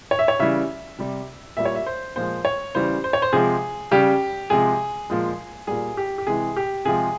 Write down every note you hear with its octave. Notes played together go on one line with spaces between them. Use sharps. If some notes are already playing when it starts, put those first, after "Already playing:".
C#5
E5
C#5
C#3 E3 G3 E5
C3 G3
A#2 G3 E5
C#5
E5
C5
A#2 F3 G#3 C5
C#5
C#3 E3 G3 C5
C5
C#5
C5
C3 F3 G#3 G#4
C#3 G3 G4
C3 F3 G#3 G#4
A#2 F3 G#3
A#2 G3 G#4
G4
G4
C3 E3 G#3 G#4
G4
C3 F3 G#3 G#4